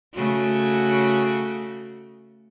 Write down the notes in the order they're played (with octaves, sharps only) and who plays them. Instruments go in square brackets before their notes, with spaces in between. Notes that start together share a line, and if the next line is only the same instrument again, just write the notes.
[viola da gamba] C#3 A3 F#4